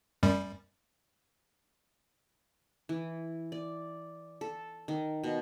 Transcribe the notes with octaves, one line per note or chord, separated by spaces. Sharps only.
F#2 G3
E3
D5
A4
D#3
B2